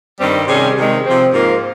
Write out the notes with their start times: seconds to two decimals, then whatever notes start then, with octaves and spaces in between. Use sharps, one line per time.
0.20 G2 D#3 G3 C4
0.48 C3 D#3 G3 C#4 G#4
0.76 C3 D#3 G#3
1.05 C3 F3 C4
1.32 G#2 F3 A#3 F4 A#4